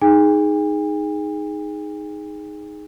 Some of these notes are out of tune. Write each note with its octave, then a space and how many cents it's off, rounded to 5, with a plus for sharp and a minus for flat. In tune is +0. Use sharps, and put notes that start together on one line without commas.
D#4 +0 G#4 +0 G#5 -45